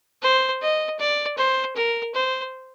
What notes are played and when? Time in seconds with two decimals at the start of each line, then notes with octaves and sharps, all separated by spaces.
0.23 C5
0.62 D#5
0.99 D5
1.37 C5
1.76 A#4
2.15 C5